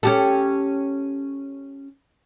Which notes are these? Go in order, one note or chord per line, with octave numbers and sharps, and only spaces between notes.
C#4 G4 A4